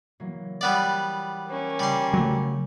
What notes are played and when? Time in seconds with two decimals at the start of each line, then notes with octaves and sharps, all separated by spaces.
0.20 E3 F#3 A#3
0.61 G3 B3 D5 C7
1.48 A#3 C#4
1.79 C#3 G3 C6
2.13 F#3 A3